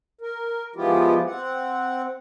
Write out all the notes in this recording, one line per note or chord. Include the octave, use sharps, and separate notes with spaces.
A#4
F3 G#3 B3 E4 F4 G4
C4 F#5